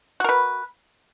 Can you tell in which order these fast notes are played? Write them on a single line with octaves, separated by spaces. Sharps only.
F#4 A#4 B4